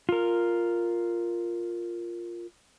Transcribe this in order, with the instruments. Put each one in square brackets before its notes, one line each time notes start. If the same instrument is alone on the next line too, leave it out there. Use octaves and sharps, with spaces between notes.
[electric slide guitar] F4 A#4